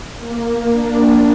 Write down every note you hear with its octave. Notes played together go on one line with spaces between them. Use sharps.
A#3
D4